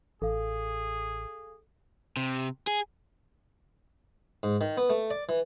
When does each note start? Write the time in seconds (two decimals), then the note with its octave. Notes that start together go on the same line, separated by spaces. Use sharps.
0.22 A1 G#4 A4 F5
2.17 C3
2.67 G#4
4.43 G#2
4.61 D#3
4.77 B3
4.90 A3
5.11 D5
5.29 E3